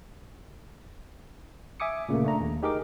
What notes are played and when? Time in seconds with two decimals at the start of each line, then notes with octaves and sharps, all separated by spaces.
1.80 E5 G#5 D6 D#6 C#7
2.09 A#2 C#3 A3 A#3
2.24 A3 D4 A#5
2.41 D#2
2.63 D#4 G4 G#4 A#4 D#5 D6